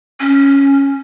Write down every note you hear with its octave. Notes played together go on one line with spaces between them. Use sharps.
C#4